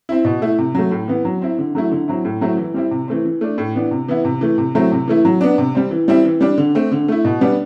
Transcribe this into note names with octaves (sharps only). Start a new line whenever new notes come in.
C4 E4
B2
A3 E4
C3
F#3 A3
A2
E3 B3
F#3
C4 E4
D3
F#3 A3 E4
D3
F#3 C4 E4
A2
F#3 A3 C4 E4
E3
G3 C4 E4
C3
E3 A3 C4
E3
A3 D4
A2
E3 B3 D4
C3
E3 B3 E4
C3
E3 A3
C3
F#3 A3 C4 E4
C3
E3 A3 E4
F#3
B3 D4
C3
G3 C4
E3
G3 C4 E4
E3
G3 D4
D3
A3 C4
D3
A3 E4
B2
G3 B3 D4